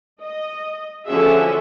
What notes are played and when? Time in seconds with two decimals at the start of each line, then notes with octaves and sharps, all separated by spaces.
0.22 D#5
1.06 D3 F3 C#4 F#4 G#4 E5